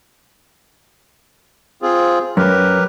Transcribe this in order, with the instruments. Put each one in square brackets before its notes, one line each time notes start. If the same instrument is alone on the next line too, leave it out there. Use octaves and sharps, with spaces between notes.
[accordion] C4 F4 G#4
[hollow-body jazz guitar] F#2 [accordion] G4 A#4 B4